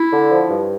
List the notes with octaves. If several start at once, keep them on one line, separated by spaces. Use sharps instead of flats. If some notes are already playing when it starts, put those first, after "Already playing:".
Already playing: E4
D3
F3
G2